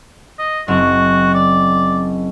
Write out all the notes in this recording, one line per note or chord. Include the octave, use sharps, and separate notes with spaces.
D#5
F#1 C4 F#4 D#5
D5